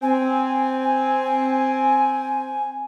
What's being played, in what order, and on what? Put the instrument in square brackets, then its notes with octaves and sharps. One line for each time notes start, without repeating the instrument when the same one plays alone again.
[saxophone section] C4 [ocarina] G#5